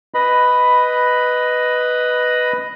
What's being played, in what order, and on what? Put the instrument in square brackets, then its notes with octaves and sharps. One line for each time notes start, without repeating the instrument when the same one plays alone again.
[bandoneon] B4 D#5 B5